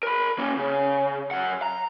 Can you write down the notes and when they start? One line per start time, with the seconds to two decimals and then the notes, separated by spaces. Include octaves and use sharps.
0.03 A#4 B5
0.39 A#3 C#4
0.57 C#3
1.31 F#2 F#5
1.62 A#5